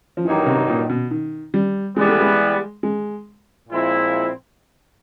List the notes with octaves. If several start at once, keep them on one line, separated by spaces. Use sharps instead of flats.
F3
G2 D#3 E3 F#3 A#3 D#4
C3
A#2
B2
D#3
G3
E3 G3 G#3 B3
A3
G#3
G#3
A#2 F3 G#3 C4 E4